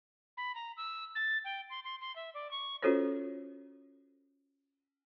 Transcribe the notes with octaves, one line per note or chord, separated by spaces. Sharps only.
B5
A#5
E6
A6
G5
C6
C6
C6
E5
D5
C#6
C#4 F4 F#4 A4 C5 C#5